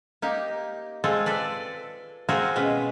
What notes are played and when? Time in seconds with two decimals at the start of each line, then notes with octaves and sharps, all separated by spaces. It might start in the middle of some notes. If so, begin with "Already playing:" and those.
0.22 A#3 D#4 G4
1.04 G#3 C4 F4 G#4 A4
1.26 A4 B4 D5
2.29 C4 F4 F#4 G#4 A#4 C5
2.56 B2 G#3 C#4 B4